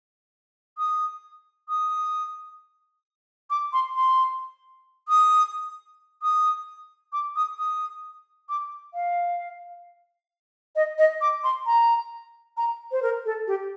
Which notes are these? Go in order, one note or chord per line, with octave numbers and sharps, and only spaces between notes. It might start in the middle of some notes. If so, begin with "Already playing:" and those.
D#6
D#6
D6
C6
C6
D#6
D#6
D6
D#6
D#6
D6
F5
D#5
D#5
D6
C6
A#5
A#5
C5
A#4
A4
G4